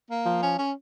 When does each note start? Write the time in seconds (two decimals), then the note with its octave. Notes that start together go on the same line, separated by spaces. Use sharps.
0.10 A#3
0.26 F3
0.43 C#4
0.58 C#4